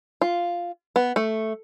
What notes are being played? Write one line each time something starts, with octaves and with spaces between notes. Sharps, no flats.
F4
B3
A3